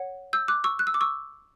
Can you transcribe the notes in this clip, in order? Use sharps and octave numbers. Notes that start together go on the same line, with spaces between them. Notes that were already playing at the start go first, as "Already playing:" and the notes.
Already playing: C#5 F#5
E6 G6
D6 F#6
C#6 E6
F#6
E6
D6
C#6 E6